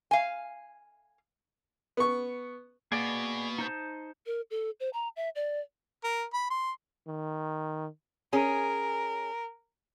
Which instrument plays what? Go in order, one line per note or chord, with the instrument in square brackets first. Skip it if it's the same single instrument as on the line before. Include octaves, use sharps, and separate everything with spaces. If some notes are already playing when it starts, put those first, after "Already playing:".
[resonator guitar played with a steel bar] F5 G#5
[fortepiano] B3 C#6
[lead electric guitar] B2 B3 [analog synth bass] A#3 [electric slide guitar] G#4 D5
[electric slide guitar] D#4 C5 A5
[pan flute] A#4
A4
C5
A#5
E5
D5
[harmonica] A#4
B5
C6
[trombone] D#3
[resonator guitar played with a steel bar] C#4 G#4 [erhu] A#4